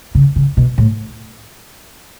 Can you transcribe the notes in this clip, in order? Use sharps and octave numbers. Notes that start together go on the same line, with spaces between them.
C#3
C#3
B2
A2